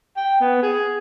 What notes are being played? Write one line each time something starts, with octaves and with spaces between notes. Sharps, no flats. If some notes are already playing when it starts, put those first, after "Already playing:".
G5
B3
G#4